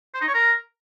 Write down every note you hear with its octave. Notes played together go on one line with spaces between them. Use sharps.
C5
D#4
C#5
A#4